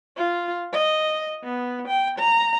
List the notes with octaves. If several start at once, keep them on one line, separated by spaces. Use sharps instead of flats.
F4
D#5
B3
G5
A#5